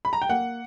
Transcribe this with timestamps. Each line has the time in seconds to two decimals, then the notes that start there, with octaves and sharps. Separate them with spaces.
0.05 B5
0.13 A#5
0.22 G5
0.29 A#3 F#5